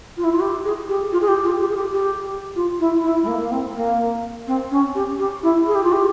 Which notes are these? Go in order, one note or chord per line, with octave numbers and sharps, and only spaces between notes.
F4
E4
F4
G4
G#4
G4
F4
G#4
G4
F4
G4
G#4
G4
G4
F4
E4
E4
G#3
A#3
A#3
C4
A#3
C4
C#4
G4
G4
E4
G#4
G4
F4
G4